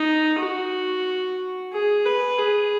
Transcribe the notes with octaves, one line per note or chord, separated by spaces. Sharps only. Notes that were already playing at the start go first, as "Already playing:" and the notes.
Already playing: D#4
F#4
G#4
B4
G#4